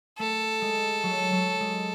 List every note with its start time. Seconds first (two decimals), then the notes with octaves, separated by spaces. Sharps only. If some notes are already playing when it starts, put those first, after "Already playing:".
0.19 A3 A4
0.62 G#3
1.03 F#3
1.32 F#3
1.60 G#3